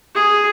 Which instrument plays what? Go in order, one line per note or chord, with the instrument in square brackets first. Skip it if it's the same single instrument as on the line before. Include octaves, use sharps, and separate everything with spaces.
[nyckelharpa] G#4